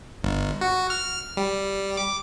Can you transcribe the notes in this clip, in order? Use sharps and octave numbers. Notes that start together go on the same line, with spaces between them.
G1
F#4
F6
G3
D6